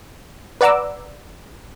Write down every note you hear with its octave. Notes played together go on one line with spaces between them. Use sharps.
B4 D5 F#5 A#5 D6 E6